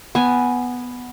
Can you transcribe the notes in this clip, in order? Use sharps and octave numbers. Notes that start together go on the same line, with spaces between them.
B3 G#5